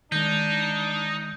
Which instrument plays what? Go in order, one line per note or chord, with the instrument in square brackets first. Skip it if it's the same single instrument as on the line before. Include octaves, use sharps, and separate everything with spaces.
[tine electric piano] D#3 G#3 [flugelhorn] D4 [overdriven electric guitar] D#4 [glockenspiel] G6